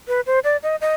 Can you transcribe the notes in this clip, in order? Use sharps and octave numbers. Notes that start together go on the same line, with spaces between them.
B4
C5
D5
D#5
D#5